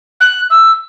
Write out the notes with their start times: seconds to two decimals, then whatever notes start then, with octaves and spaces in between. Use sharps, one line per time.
0.20 F#6
0.50 E6